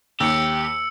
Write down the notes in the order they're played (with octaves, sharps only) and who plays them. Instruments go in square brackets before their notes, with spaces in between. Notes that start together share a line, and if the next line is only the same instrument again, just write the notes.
[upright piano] D#2 [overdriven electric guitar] G4 [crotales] E6 C#7